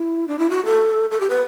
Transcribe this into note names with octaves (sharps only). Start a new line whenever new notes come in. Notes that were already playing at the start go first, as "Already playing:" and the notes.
Already playing: E4
D4
E4
F#4
A4
A4
G4
B4